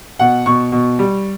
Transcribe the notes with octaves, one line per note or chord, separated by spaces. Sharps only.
B2 F#5
B2 C#6
B2
G3